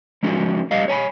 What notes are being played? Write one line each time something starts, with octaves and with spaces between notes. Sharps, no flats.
F3 G#3 C#4 F#4 G#4
G3 D#5 F5
C#5 G#5 A5 B5